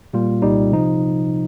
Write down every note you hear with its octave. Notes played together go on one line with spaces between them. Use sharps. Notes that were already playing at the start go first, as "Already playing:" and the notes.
A#2 G3 A#3 F4
C2 A#2 G3 D#4
C3 F3 D#4